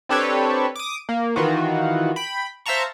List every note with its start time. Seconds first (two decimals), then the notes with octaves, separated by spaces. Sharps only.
0.09 C4 D4 G4 A4 B4 C#5
0.76 D6 D#6
1.09 A#3
1.36 D#3 E3 F4 F#4
2.16 G5 B5
2.66 C5 E5 F5 A5 A#5 C#6